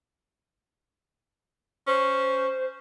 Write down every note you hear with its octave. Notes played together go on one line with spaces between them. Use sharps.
C#4 C5